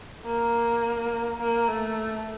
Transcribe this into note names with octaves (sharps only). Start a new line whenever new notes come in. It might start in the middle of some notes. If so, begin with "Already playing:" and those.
A#3
A#3
A3